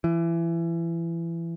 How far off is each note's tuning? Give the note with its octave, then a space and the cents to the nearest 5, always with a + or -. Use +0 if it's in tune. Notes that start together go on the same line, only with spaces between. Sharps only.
E3 +25